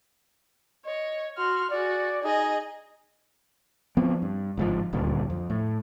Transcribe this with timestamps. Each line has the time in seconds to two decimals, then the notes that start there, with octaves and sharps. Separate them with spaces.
0.85 C#5 D#5
1.37 F#4 C6 F6
1.70 F#4 G#4 D5
2.24 D#4 G#4 D#5
3.97 F3 B3 C4
4.22 G2
4.57 G1 G#2 F3
4.93 D#1 D2 G2 A#2
5.30 F2
5.50 A2